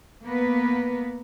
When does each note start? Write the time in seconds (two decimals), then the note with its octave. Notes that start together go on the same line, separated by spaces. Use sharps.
0.25 A#3 B3 B4